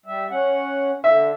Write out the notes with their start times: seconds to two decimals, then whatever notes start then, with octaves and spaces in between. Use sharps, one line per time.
0.06 G3 E5
0.31 C#4 F#5
1.04 D3 E5